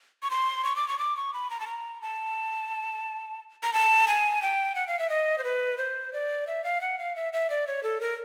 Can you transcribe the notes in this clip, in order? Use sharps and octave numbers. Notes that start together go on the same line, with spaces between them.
C#6
C6
C#6
D6
C#6
D6
C#6
B5
A#5
A5
A#5
A5
A#5
A5
G#5
G5
F#5
F5
E5
D#5
C5
B4
C5
D5
E5
F5
F#5
F5
E5
E5
D5
C#5
A4
A#4